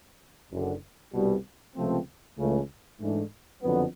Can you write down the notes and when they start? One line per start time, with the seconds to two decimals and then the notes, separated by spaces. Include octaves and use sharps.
0.52 F#1 F#2 D3
1.14 C2 B2 G3
1.76 C#2 C3 F3 A3 C4
2.38 C#2 C#3 E3 A3
3.01 G#2 E3 A3 D4
3.62 F#1 F2 D3 F#3 B3